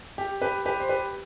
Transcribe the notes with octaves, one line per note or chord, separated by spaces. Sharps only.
G4
G4 B4
G4 B4
C5
G4 B4